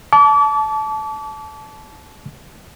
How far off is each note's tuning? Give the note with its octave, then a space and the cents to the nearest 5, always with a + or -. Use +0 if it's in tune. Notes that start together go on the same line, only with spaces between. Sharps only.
A5 -20 D6 -35